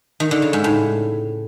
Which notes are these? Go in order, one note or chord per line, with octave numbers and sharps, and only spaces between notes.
D#3
D3
C#3
G#2
A2